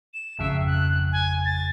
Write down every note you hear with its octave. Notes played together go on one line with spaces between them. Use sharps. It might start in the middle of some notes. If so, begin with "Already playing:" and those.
E7
G#1 F2 C#3 E5
F#6
G#5
A6